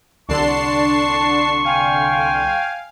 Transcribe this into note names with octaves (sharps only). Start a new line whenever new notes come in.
C2 D3 D4 A5 C6 C#6 C7
F5 G5 G#5